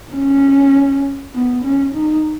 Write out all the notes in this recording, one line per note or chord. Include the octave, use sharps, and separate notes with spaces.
C#4
B3
C#4
D#4